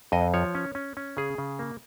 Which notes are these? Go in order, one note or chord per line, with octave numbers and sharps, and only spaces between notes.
F2 D#5
F3 C#5
C#4
C#4
C#4
C#3 G#4
C#3
A#3